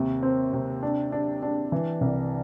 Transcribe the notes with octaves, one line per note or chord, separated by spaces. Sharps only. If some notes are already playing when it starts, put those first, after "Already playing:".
Already playing: D#2 C3
C4
C3
D4
D4
D4
E3
C2